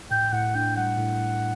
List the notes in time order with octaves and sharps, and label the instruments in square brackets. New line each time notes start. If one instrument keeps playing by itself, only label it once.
[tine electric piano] A2 [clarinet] G5
[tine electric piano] A2 [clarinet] F#5
[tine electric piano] D4 [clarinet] G5
[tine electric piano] G3 [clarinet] F#5
[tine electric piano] A2